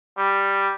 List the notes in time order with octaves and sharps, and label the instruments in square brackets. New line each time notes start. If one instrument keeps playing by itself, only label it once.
[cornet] G3